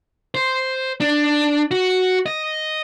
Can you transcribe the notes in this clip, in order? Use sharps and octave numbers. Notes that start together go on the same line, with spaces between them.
C5
D4
F#4
D#5